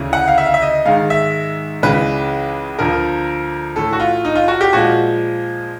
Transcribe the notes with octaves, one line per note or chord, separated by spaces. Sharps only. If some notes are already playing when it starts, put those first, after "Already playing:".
Already playing: D2 C#3 E3
F#5
F5
E5
F5
E5
D#5
G#2 D#3 G#3 F5
E5
C#2 C#3 E3 G#3 B4
D2 D3 F3 A#4
A2 E3 A3 A4
F#4
F4
D#4
F4
F#4
G4
A#2 F3 G#3 F#4